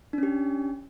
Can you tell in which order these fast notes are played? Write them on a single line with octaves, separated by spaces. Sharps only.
D4 C#4 G4